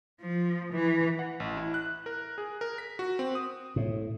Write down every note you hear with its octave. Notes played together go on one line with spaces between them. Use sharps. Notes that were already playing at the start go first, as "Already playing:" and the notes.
F3
E3
F#5
A1
E4
F#6
A#4
G#4
A#4
B6
F#4
C4
D#6
A2